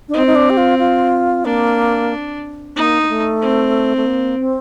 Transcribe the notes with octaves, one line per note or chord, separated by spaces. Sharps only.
D4
C4 D#4
D#4
D4
G4
F4
F4
A#3 D4
A#3 D#4
A#3
A3
C4
A3
A#3
C4